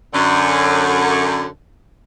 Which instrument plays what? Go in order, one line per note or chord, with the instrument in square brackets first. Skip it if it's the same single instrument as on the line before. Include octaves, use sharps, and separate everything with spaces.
[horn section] F#2 D3